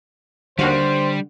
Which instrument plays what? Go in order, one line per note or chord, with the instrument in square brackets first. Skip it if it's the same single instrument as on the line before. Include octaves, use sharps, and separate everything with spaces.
[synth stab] D#2 F#4 F5 [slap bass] D3 [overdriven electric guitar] G3 [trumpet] C5